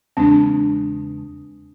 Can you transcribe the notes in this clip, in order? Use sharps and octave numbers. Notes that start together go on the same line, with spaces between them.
E2 C#3 G#3 C4 D4